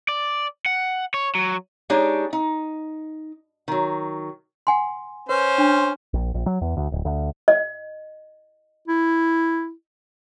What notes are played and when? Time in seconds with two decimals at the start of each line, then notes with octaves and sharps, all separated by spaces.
0.08 D5
0.66 F#5
1.14 C#5
1.35 F#3
1.90 G#3 D4 D#4 G4 C#5
2.33 D#4
3.68 D#3 F#3
4.67 F#5 G#5 C6
5.29 C#4 B4 C5
5.58 D4
6.14 A#1
6.34 A#1
6.46 F#3
6.62 E2
6.77 D2
6.92 D1
7.05 D2
7.48 D#5
8.88 E4